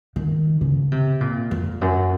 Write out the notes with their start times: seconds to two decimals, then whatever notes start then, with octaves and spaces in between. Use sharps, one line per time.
0.16 D#3
0.61 C#3
0.92 C3
1.21 A#2
1.51 F2
1.81 F#2